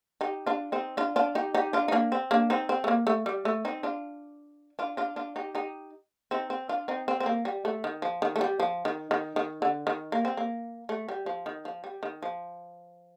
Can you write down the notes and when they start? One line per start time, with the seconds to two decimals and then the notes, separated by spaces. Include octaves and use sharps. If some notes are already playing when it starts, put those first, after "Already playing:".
0.21 D#4 G4
0.46 D4 F4
0.72 C4 D#4
0.97 D4 F4
1.16 D4 F4
1.35 D#4 G4
1.55 D#4 G4
1.73 D4 F4
1.88 D#4
1.92 A#3 D4
2.12 C4
2.31 A#3 D4
2.50 C4 D#4
2.69 C4
2.84 A3
2.88 A#3
3.07 A3
3.26 G3
3.45 A3
3.65 C4 D#4
3.83 D4 F4
4.79 D4 F4
4.97 D4 F4
5.16 D4 F4
5.36 D#4 G4
5.55 D#4 G4
6.31 C4 D#4
6.50 C4
6.69 D4 F4
6.88 C4 D#4
7.08 C4
7.20 C4
7.26 A#3
7.45 G3
7.65 A3
7.84 D#3
8.02 F3
8.22 D#3
8.36 A3
8.41 G3
8.60 F3
8.85 D#3
9.11 D#3
9.36 D#3
9.62 D3
9.87 D#3
10.12 A#3
10.25 C4
10.37 A#3
10.89 A3
11.09 G3
11.26 F3
11.46 D#3
11.65 F3
11.84 G3
12.03 D#3
12.23 F3